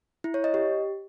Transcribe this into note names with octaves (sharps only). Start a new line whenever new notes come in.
E4
C#5
D#5
G4